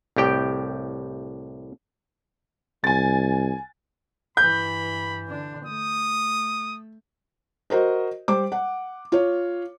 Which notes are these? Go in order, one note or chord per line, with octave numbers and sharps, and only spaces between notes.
C2 A2 G4 G5
C2 G#5 A6
G2 E3 B5 G6
D3 D4
A3 D#6
F#4 A#4 C5 D#5
G3 C5 D6
F#5
F4 C#5